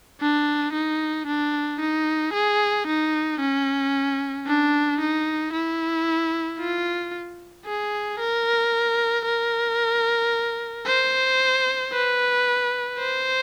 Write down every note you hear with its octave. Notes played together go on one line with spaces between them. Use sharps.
D4
D#4
D4
D#4
G#4
D#4
C#4
D4
D#4
E4
F4
G#4
A#4
A#4
C5
B4
C5